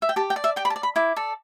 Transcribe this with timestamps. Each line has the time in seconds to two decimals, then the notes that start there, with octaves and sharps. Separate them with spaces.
0.02 E5
0.09 G5
0.16 G4 A5
0.30 G5
0.36 D5
0.44 E5
0.56 G4 G5
0.65 B5
0.70 A5
0.76 D5
0.83 B5
0.96 E4 D6
1.16 A4 D5